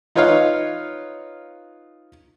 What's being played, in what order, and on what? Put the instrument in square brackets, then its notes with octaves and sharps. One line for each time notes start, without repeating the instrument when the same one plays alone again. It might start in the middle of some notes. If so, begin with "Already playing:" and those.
[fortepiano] D#4 F4 B4 C#5 D#5 F5